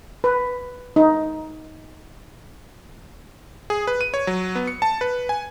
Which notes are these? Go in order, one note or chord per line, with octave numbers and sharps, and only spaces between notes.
B4
D#4
G#4
B4
D#7
C#5
F#3
B3
C#7
A5
B4
G#5